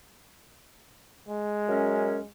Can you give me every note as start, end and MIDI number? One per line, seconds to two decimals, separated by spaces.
1.29 2.28 56
1.68 2.18 42
1.68 2.18 61
1.68 2.18 70